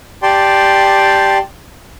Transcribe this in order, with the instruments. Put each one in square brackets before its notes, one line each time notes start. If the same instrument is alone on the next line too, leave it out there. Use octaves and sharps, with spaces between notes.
[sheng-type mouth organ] G4 D5 G5 A5 C6